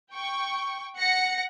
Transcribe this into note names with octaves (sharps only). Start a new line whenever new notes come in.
G5 C#6
F#5 A#6 C#7